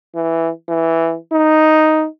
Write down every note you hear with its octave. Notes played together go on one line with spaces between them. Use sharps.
E3
E3
D#4